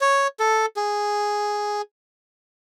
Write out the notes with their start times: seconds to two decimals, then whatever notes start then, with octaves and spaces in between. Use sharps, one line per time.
0.01 C#5
0.40 A4
0.77 G#4